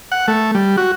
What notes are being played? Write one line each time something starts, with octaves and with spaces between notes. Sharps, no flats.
F#5
A3
G3
F#4